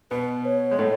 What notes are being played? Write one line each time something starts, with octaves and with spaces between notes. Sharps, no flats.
B2 B3 B4
C#5
G#3
A2 A3